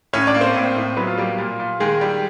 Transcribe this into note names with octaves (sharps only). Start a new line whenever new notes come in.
A2 C#4 C#5
D4 D5
A#3
C4 C5
A2
A2
F#3 B3 B4
F4
G3 A#3 G4
A#2
A#2
D#3 G#3 G#4
G3